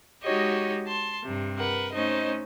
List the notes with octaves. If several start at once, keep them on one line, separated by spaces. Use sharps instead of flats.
G#3 D#4 F#4 G4 C#5 D#5
A5 C6
G2 C3
A#4 B4 F#5
A3 C#4 D#4 C5 D#5